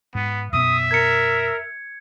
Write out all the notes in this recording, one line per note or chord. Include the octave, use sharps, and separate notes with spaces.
G#2 B3
F#2 B2 B3 E5 D#6
A#4 G#6 C#7